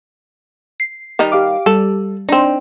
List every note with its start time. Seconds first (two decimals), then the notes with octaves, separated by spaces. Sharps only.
0.80 C7
1.19 D#3 G3 D#4
1.32 G4 F5 D6
1.66 G3 A4
2.29 C4 D4 D#4